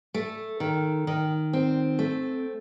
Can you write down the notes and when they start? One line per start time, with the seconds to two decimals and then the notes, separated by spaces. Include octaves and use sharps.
0.14 A3
0.60 D#3
1.07 D#3
1.53 C4
1.99 A3